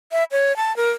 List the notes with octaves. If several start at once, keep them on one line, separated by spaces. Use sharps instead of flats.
E5
C#5
A5
A#4